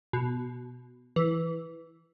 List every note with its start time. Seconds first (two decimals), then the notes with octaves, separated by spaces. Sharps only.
0.13 B2
1.16 E3